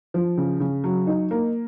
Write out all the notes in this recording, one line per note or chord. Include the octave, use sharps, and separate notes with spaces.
F3
C#3
C#3
F#3
D#4
A#3